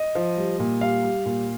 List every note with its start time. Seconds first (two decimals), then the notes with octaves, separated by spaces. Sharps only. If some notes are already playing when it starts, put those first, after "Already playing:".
Already playing: D#5
0.15 F3
0.37 G3
0.59 A#2
0.81 G3 F5
1.03 G3
1.26 A#2